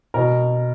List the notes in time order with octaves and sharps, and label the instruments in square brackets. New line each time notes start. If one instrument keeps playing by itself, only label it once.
[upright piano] B2 A#4